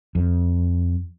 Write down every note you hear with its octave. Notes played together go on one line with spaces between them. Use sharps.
F2